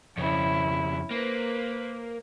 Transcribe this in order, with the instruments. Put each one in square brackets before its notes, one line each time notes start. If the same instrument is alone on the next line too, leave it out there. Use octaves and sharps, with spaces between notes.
[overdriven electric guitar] F2 C#3 [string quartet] C#4 E4
[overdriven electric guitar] A#3 [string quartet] B4 C5